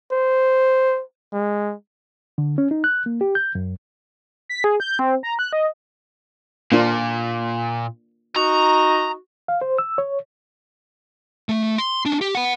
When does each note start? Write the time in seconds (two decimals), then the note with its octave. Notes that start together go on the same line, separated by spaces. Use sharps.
0.11 C5
1.32 G#3
2.38 D3
2.58 C#4
2.71 D#4
2.84 F#6
3.06 A#3
3.21 G4
3.35 G6
3.55 F#2
4.49 B6
4.64 G#4
4.80 G6
4.99 C4
5.23 A#5
5.39 F#6
5.53 D#5
6.72 A#2 A#3 D4 F4
8.36 D#4 F#4 A#5
9.48 F5
9.61 C5
9.78 E6
9.98 C#5
11.49 A3
11.78 C6
12.05 C#4 D4
12.21 G4
12.35 F#5 B5